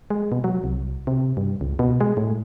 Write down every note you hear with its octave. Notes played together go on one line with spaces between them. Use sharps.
G#3
B2
F#3
C2
C3
G2
C#2
B2
G#3
A2